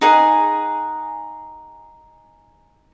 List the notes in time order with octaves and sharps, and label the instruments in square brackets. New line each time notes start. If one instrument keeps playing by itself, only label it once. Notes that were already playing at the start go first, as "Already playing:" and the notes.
[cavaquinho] D#4 G#4 F#5 G#5